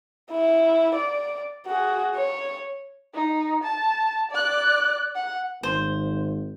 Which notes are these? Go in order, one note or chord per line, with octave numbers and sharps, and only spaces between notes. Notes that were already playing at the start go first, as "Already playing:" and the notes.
E4
D5
F#4 G#4
C#5
D#4
A5
D5 F#6
F#5
G#1 C5